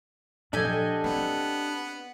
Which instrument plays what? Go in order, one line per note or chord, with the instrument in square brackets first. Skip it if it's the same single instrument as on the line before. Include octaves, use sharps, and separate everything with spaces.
[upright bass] A#2 F3 [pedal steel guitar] D4 D#5 [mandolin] G4 A4 G#5
[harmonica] B3 [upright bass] C4